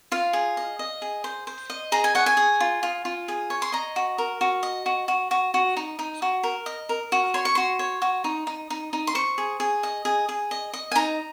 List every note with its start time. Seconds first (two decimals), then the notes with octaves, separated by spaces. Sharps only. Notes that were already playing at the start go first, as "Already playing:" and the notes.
0.12 F4 F5
0.33 G#4
0.57 D#5
0.79 D#5
1.02 G#4
1.24 C5
1.47 C5
1.70 D#5
1.92 G#4 A#5
2.04 G#5
2.15 C#5 F#5
2.26 G#5
2.37 G#4
2.60 F4
2.83 F4
3.05 F4
3.28 G#4
3.50 C#5
3.62 C6
3.72 D#5 A#5
3.96 F#4
4.18 A#4
4.41 F#4
4.63 D#5
4.86 F#4
5.08 F#4
5.31 F#4
5.54 F#4
5.77 D#4
5.99 D#4
6.22 F#4
6.43 A#4
6.66 D#5
6.89 A#4
7.12 F#4
7.34 C#5 C6
7.45 C#6
7.55 F#4 C6
7.79 C#5
8.02 F#4
8.24 D#4
8.47 D#4
8.70 D#4
8.93 D#4
9.07 C6
9.15 C5 C#6
9.38 G#4
9.60 G#4
9.83 D#5
10.05 G#4
10.29 G#4
10.51 D#5
10.73 D#5
10.92 G#5
10.95 D#4 A#5